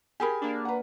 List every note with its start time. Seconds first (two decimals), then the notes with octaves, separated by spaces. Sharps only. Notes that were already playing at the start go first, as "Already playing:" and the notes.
0.20 G4 G#4 A#4 G#5 B5
0.41 A#3 D4
0.65 B4 F#5